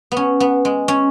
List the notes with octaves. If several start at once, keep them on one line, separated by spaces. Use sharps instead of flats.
B3
C#4
B3
G#3
C#4